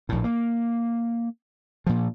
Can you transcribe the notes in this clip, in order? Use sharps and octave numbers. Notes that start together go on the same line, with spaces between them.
A#1 A2
A#3
A#2 F3